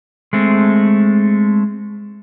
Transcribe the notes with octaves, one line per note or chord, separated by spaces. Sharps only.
G#3 A3 C4